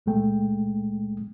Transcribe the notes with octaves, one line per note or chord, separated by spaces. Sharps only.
C#2 A#2 G#3 A3 G5